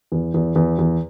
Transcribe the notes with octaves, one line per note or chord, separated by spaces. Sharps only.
E2
E2
E2
E2